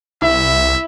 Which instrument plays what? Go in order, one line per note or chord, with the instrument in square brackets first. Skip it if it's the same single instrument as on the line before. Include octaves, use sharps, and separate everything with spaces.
[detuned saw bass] C2 [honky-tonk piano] E4 [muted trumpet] E5